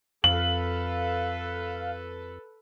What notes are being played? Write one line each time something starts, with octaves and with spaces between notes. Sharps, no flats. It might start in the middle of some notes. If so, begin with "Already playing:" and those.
F2 A4 B4 F5 F#7